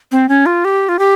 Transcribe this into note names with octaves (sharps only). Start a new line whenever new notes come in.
C4
C#4
F4
G4
F4
G4